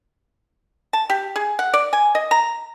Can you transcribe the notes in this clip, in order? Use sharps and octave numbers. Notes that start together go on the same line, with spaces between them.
A5
G4
G#4
F#5
D5
G#5
D#5
A#5